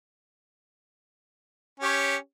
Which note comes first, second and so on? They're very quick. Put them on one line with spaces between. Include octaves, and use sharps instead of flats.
C#4 G4 C#5